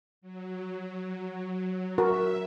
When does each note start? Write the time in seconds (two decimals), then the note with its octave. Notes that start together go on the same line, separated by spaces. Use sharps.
0.21 F#3
1.98 F#4 A#4 E5